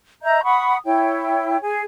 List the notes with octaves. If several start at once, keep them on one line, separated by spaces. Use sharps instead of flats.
D#5 E5 A#5 G6
F#5 B5 C#6 D#6
E4 C#5 G5
G#4 G#5